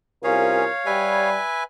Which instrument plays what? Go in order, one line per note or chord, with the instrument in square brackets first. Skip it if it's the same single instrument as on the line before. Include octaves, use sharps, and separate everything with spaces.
[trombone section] C2 F4 A#4 [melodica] C#4 G#4 [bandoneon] C#5 F5
[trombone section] G3 [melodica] B4 E5 G#5